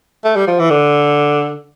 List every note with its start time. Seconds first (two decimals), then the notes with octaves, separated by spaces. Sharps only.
0.24 A3
0.36 G3
0.47 F3
0.59 E3
0.70 D3